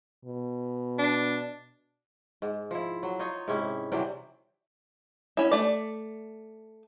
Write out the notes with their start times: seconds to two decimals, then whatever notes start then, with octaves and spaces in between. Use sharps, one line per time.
0.25 B2
0.99 D4
2.42 G#2
2.71 F3 E4
3.03 F#3
3.19 D#4 F4 C#5 D#5
3.48 G#2 C3 C#4 E4
3.92 C3 E3 F#3 G3
5.37 C#4 E4
5.51 A3 D5